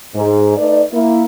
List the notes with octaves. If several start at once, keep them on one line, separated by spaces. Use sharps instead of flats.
G#2
A3 D#4 B4 D5
A#3 E4